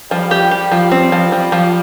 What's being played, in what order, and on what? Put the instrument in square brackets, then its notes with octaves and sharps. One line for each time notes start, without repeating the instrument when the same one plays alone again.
[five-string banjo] F3 [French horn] G3
[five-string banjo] G4
G4
F3
C4
F3
F3
F3